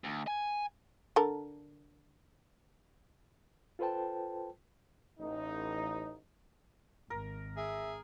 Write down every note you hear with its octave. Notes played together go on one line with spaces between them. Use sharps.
D2
G#5
D3 A4 A#4
F4 A4 B4 C5 G5 A5
A1 D#4
G#1 A#4
G#4 E5